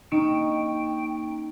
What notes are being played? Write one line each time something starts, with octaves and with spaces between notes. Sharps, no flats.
A#3 C#4 D#4 G5